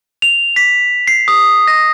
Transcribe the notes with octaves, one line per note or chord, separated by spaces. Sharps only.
F7
B6
C7
D#6
A#6